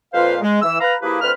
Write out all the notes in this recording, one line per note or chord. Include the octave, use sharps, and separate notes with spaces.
F2 A#2 F4 B4 C5 F5
G#3
E3 E6
B4 F5 A#5
F3 A#3 E4 G4 G#4 B4
D2 C4 B4 F6